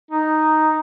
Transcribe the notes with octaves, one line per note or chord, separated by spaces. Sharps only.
D#4